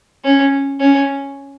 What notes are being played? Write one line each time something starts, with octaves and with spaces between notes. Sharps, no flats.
C#4
C#4